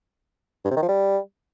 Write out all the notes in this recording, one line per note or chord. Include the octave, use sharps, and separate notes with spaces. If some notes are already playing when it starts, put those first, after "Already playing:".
G2
C3
D#3
F3
G3